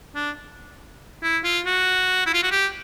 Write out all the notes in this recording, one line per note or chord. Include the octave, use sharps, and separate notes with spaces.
D4
E4
F4
F#4
E4
F4
F#4
G4